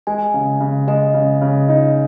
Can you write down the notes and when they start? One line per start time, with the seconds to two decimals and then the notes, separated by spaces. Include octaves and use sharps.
0.07 G#3 G#5
0.34 C#3
0.61 C#3
0.88 G#3 D#5
1.14 C#3
1.41 C#3
1.69 D#4